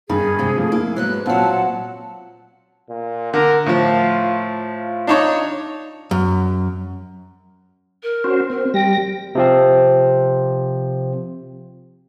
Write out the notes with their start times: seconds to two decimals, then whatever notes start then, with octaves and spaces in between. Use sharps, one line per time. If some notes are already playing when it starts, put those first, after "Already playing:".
0.09 G2 D#3 G#4
0.39 G#2 C3
0.58 F3 A3
0.72 A#3 E4
0.96 G#2 F#3 B3 F#6
1.26 A#2 F#3 C4 F4 F#5 A5
2.90 A#2
3.34 D3 A#4
3.66 A2 F3 F4
4.70 F4
5.07 D4 D#4 C#5
6.11 F#2
8.03 A#4
8.24 C#4 F#4 C5
8.50 C4 A#4
8.74 G3 G5 A#6
9.35 C3 F3 C4